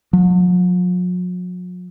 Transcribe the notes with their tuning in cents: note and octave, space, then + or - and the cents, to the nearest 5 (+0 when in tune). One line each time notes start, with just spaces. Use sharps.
F#3 -45